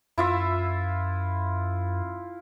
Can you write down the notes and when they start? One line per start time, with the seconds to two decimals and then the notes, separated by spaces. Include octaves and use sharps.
0.18 F#2 E4 F4 E5